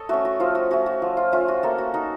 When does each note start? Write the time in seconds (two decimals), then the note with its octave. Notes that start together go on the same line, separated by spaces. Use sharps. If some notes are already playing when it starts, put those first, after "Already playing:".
Already playing: A4 C#5 D#5
0.09 A3 C#4 F#4
0.25 F#4
0.40 F3 F4
0.55 F#4
0.71 A3 C#4 F#4
0.86 F#4
1.02 F3
1.17 F4
1.32 A3 C#4 F4
1.48 F#4
1.63 A#3 A4
1.78 F#4
1.94 D#4 F#4